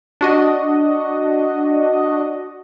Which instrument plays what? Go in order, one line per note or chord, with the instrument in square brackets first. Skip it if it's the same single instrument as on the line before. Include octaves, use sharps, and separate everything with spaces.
[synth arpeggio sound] D4 F#4 D#5